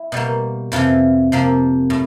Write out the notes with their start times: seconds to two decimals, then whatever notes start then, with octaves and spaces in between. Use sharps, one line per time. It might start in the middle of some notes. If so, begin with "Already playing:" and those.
Already playing: E4
0.12 B2 G3 A#3
0.72 F2 C3 E3 F4
1.32 C3 F3 A#3
1.90 A2